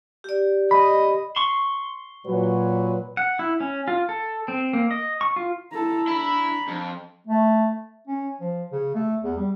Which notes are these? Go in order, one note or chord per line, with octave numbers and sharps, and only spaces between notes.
G4 D5
D#5 B5
C6 C#6
A#2 F#3 B4
F#5
E4
C#4
F4
A4
C4
A#3
D#5
C#6
F4
E4 A4 A#5
D4 E4 B5
F2
A3
C#4
F3
C#3
A3
E2
G3